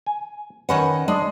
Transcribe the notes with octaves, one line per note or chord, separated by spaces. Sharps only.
G#5
D#3 C#4 B4 D#5 F#5
G#3 D4 D#5